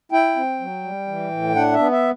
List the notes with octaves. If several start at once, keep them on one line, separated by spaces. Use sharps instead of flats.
E4 G5
C4
F#3
G3
E3
A2
D4 F#5
E5
B3
E5